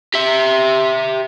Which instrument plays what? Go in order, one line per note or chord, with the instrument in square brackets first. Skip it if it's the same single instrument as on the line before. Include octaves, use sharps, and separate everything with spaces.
[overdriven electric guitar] G4 E5